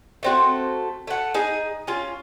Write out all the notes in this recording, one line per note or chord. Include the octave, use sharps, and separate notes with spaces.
A3 C4 F#4
A3 F#5
D#4 G#4 G#5
C#4 F4